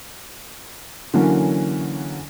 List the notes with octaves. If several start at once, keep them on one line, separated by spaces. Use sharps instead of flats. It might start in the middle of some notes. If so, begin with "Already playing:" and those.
D3 E3 F#3 A#3 C#4